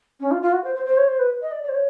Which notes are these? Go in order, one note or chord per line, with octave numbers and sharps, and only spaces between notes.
C#4
F4
F4
F#4
C5
C5
C5
C#5
C5
B4
D#5
D5
D5
C5
C#5